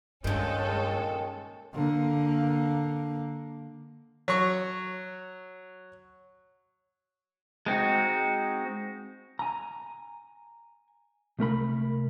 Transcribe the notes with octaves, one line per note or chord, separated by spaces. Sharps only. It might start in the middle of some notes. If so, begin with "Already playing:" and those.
G2 A#2 D#3 G#3 C#4 A4
D3 A#3
F#3 C#6
G#3 C4 D#4 F#4
G#5 A#5
C2 A3 A#4 B5